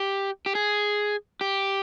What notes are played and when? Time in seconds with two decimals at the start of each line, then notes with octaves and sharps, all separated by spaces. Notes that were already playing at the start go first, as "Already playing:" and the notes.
Already playing: G4
0.46 G4
0.55 G#4
1.41 G4